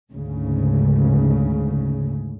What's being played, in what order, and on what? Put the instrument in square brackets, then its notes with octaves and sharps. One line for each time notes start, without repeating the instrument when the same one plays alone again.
[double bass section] D2 G#2 C#3